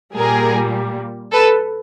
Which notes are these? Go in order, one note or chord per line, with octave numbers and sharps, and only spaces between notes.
A#2 G3 A#3 G#4 A#4
A4 B4